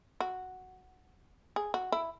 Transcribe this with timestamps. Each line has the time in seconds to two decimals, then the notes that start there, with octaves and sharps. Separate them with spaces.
0.20 F#4
1.56 G#4
1.74 F#4
1.92 E4